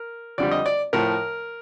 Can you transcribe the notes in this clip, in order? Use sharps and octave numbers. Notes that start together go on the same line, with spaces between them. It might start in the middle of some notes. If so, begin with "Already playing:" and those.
Already playing: A#4
F2 D3 G3 D5
D#5
D5
A2 F3 A#4